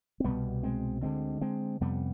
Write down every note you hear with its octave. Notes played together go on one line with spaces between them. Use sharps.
C4
C2 B2 G3 B3
G#3 C4
D2 D3 G#3 C4
G#3 C4
F2 C3 G3 B3